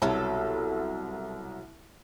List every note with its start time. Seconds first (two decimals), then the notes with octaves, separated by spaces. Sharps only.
0.02 C2 B2 F#3 A4